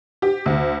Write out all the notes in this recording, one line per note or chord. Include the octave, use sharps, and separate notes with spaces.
G4
D2